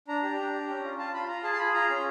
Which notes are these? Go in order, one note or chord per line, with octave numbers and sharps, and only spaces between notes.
D4 A#5
G4
D4
G4
C#4
F4
F4 A5
F4 B5
F4 A#5
G#4 A5
C6
G#4 B5
F4 A#5
C#4